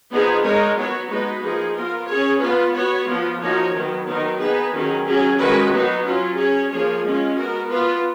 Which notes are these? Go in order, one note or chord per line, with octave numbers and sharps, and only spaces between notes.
F3 B3 D#4 G#4
G#3 D#4 A#4 C#5
F#3 B3 F#4 C#5
G#3 B3 D#4 F#4 B4
F3 A#3 D#4 G#4
B3 F4 A#4
C#4 G#4 C#5
B3 F4 B4
B3 F#4 C#5
F3 B3 F4
F3 A#3 D#4 F#4 C#5
D#3 F#3 B3
D#3 F#3 B3 D#4 A#4
B3 D#4 G#4 B4
D#3 F#3 C#4 G#4
F#3 C#4 G#4
D#3 G#3 C#4 F#4 B4
F#3 B3 D#4 F#4
F#3 C#4 F4
C#4 G#4 C#5
F3 A#3 F4 G#4 C#5
G#3 C#4 F4
B3 F#4 A#4
B3 F4 B4